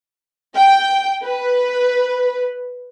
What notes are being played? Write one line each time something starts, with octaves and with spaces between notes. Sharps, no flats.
G5
B4